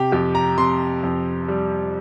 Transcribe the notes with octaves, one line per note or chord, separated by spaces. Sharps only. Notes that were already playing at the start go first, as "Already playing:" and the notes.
Already playing: C3 G4
F2 G4
A#5
C3 C6
F2
G3